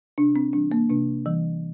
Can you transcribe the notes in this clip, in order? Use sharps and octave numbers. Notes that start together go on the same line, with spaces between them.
C3 D4
C4
E3 G3 D4
A#3
C3 D4
E3 G3